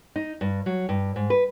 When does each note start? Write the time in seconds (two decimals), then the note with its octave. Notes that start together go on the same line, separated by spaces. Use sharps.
0.16 D#4
0.41 G2
0.66 F#3
0.89 G2
1.16 G#2
1.30 B4